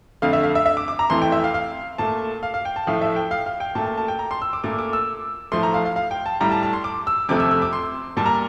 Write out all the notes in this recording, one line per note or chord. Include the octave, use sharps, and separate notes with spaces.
F2 D3 A3 F5
E5
F5
E5
E5
D6
D6
A#5
F2 E3 A3 C6
G5
E5
F5
F5
A#2 A3 A5
F5
F5
G5
A5
A2 F3 A3 F5
E5
G5
F5
F5
G5
A#2 A3 A5
A5
A5
G5
A#5
C6
E6
D6
A#2 A3 D6
D6
E6
A2 F3 A3 C6
A#5
F5
F5
F5
G5
A5
A2 G3 A#5
A5
A5
C6
D6
E6
F2 C3 F3 A3 D6
E6
E6
D6
C6
A#2 G3 A5
A#5